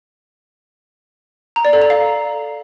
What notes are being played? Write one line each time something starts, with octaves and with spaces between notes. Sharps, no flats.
A#5
D5
A4
A#5
F5